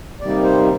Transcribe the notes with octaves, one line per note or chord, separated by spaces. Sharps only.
C3 D#3 G3 A#3 D#4 D5
C5